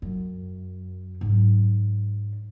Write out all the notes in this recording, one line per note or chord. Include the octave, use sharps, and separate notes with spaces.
F#2
G#2 F#3